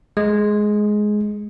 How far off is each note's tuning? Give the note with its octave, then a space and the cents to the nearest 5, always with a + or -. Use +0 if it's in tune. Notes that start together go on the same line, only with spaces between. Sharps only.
G#3 +10